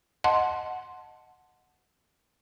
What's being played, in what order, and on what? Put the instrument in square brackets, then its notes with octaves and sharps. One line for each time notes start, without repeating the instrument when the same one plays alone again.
[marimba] D#5 F#5 A5 C6